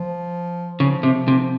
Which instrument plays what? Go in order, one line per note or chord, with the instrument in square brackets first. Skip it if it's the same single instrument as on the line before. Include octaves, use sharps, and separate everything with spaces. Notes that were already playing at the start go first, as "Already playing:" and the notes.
Already playing: [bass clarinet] F3
[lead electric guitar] C#3 [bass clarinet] F3
[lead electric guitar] C3
C3